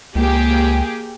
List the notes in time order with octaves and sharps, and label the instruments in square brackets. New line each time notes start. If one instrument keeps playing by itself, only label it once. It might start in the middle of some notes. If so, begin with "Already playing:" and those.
[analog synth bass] C#2 [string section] A#3 G4 G#4